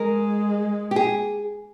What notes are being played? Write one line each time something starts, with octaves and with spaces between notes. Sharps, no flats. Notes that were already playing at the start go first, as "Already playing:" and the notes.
Already playing: G#3 A#4
G4
G#4